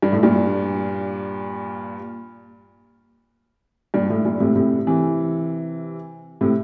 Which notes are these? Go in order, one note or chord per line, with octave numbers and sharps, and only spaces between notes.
G2
A2
G2 A#2
G2 A#2
A2
G2 A#2
A2 C3
A2 C3
C3 E3
A2 C3